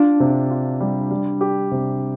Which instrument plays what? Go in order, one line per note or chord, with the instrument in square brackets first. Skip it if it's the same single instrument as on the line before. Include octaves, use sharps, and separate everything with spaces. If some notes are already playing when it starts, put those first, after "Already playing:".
Already playing: [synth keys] D4 [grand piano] F4
[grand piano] C3
F4
G3
G3
G4
C3